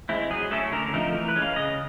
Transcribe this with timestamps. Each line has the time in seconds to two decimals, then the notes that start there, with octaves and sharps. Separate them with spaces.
0.09 G#3 C4 E4
0.30 F#3 G#4
0.51 A3 C#4 E4 A4
0.72 D3 A#4
0.93 F3 A3 C4 D#4 A#4
1.14 E3 A#4
1.28 B4
1.36 G#3 C#4
1.42 F5
1.56 C#3 D#5